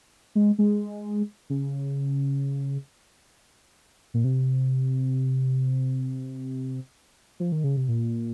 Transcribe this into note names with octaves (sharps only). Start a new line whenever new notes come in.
G#3
G#3
C#3
A#2
C3
F3
D#3
C#3
C3
A#2